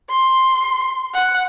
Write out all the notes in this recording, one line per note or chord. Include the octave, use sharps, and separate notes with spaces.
C6
F#5